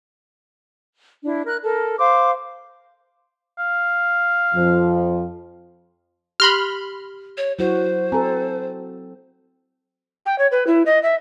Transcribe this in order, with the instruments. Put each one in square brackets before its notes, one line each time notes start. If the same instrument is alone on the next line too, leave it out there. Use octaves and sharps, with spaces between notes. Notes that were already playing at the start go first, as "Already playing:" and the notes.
[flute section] D4 E4
A#4 F#6
A4 A#4
C5 F5 C6 D6
[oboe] F5
[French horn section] F2 F3
[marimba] G4 F#6 A#6 [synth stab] B5 C6 F6
[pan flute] C#5
[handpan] F#3 F#4 [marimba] E4 [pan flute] C5
[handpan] C4 A4 [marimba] G#5 A#5
[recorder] G5
C#5
B4
E4
D#5
E5